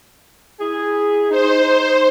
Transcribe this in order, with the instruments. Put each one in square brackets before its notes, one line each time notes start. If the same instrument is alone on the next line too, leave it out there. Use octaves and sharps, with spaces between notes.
[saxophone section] E4 G#4
[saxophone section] D#4 [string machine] C5